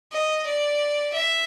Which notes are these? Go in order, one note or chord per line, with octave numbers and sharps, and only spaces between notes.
D#5
D5
E5